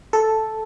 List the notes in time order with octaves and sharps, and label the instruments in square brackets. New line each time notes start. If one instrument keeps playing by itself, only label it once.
[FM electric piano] A4